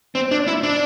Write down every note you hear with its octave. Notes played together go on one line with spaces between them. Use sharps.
C4
D4
E4
D4